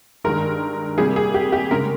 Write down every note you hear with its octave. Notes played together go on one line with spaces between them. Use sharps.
G2 D#3 G#3 A#4
C3 G3 A#3 G#4
G#4
G4
G4
C#3 G#3 A#4